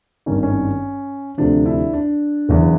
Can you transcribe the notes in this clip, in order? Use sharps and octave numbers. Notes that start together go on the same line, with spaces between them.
G#1 G2 D#3 C#4
C#4
D2 C3 F3 D4
D4 E4
D4
F#1 E2 C#3 E3